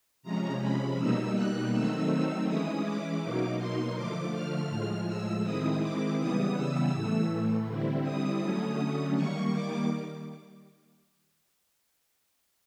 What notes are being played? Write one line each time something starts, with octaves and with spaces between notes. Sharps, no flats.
C3 F3 G#3 C#4 A#5
B5
B2 G3 A#3 D#4 E6
F#6
D#3 F#3 A3 C4 D#4 E6
E3 G#3 C#4 E4 D#6
D6
B2 F#3 A#3 D#4
C6
D3 F3 A3 D6
F6
A2 F3 G#3
E6
D#3 G#3 C4 E4 D#6
D6
C#3 E3 G3 B3 D#6
E6
A2 E3 A3
D3 G3 C4 E4
D#6
D3 F#3 A3 C#4
D#3 G3 A#3 C#6
D6